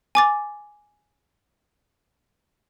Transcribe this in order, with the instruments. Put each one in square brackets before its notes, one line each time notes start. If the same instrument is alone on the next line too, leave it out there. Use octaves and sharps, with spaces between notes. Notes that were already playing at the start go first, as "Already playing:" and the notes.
[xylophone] G#5 D6 A6